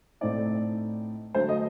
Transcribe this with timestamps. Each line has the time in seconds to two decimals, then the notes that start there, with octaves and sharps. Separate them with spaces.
0.21 A2 A3 C4 D#4 D5
1.34 D3 F#3 A3 C5
1.49 D#5